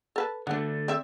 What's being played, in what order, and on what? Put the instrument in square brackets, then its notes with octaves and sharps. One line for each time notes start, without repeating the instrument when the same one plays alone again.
[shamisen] A4 B4 A5
[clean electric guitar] D3 A3 [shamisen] B3 D4
[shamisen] C4 D5 E5